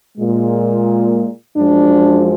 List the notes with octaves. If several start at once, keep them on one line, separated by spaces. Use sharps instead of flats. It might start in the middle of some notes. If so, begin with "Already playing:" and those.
A#2 G#3
F#2 F3 G#3 D4